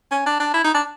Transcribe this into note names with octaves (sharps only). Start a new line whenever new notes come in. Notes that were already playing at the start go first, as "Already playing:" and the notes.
C#4
D4
D4
E4
D#4
D4